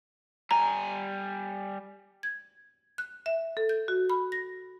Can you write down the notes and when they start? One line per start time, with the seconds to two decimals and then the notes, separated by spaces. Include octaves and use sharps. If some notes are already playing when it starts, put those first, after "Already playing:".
0.51 G3 G#5 A#5
2.23 G#6
2.98 F#6
3.26 E5
3.57 A4
3.69 G6
3.88 F#4
4.10 B5
4.32 A#6